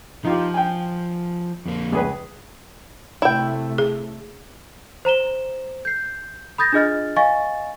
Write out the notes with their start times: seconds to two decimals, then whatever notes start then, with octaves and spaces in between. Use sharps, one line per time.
0.25 F3 D#4 F4 G4
0.54 G5 G#5
1.66 F2 A#3
1.92 C#2 G#4 B4
3.22 C3 A3 E4 G5
3.78 G#4
5.05 C5 A#5 E7 G7
5.85 G6 C7
6.58 B5 D#6 G6 A6 A#6
6.73 D4 F4 G#4 D#5 F6 A6
7.16 D#5 F5 G#5 C#6 A6